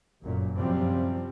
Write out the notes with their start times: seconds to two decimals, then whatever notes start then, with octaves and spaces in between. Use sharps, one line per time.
0.23 G1 F#2 A#2
0.58 F#2 C3 F3 G3 C4